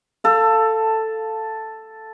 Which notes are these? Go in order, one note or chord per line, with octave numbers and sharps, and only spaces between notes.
A4 F5